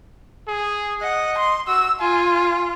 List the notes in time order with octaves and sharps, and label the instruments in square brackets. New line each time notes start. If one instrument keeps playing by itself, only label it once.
[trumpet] G#4
[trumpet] D#5 [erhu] F#5
[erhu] C6
[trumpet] F#4 [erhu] E6
[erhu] F4 [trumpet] G#5